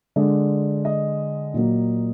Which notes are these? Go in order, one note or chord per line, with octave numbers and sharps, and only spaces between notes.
D3 G#3 D5
D#5
A#2 F#3 A#3